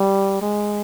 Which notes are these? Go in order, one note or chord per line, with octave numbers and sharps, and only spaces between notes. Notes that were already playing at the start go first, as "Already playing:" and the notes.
Already playing: G3
G#3